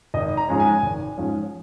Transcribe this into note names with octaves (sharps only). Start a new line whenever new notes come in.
G#1 D#5
A#5
G#2 F3 G#3 C#4
G#5
G#1
G#2 F3 G#3 C#4